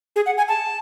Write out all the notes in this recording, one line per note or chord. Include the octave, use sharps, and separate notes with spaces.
G#4
F#5
G#5
A5